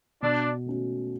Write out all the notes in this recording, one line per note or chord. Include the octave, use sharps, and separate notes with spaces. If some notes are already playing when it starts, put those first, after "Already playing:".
B2 D4
A3 C#4 F#4